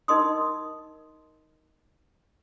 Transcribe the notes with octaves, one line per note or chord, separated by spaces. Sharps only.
D#4 A#4 D#5 C6 D#6